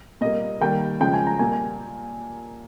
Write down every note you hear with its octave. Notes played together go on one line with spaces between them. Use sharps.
A#2 G3 A#3 D#5
D#3 G3 A#3 G5
C#3 F3 G#3 G5
G#5
A#5
A#2 G3 A#3 G#5
G#5